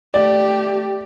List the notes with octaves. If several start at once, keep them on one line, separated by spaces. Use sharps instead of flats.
A3 G4 D5